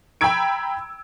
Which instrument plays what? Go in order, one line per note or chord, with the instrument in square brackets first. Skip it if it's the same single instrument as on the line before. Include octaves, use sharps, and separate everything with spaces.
[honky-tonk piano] G5 A#5 B5 E6 G#6 D7